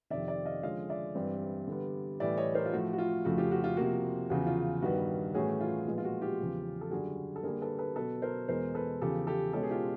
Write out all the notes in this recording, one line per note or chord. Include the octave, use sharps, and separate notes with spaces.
F2 C3 D#3 D5 E5
D5 E5
D#5 F5
D3 F3 G#3 C#4 D#5 F5
D5 E5
G2 E3 G3 C4
D3 G3 B3
A2 E3 G3 D5 E5
C#5 D#5
A#4 C5
F4
A2 F3 A3 F#4
F#4
F4
F2 C#3 F3 A3 F#4
F4 G4
F#4
F4
C3 F3 A#3 F#4
E2 C#3 F3 F#4
F4
G2 D#3 G3 B3 F#4
A2 E3 A3 C#4 F#4 G#4
F4
A#2 F3 G#3 B3
F4
F#4
F4 G4
E2 C#3 F3
A4
F#2 D3 G3 F#4 G#4
A4
D3 G3 A#3 G#4 A#4
A4 B4
A4 B4
B2 F#3 B3 A4 B4
A#4 C5
E2 B2 G#3 A#4 C5
A4 B4
E2 C#3 F3 G4 A4
G4 A4
B2 G#3 C#4 G4 A4
G#4
F4 G4